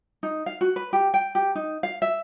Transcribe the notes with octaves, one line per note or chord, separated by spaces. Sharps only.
D#4
F5
F#4
B4
G4
G5
G4
D#4
F5
E5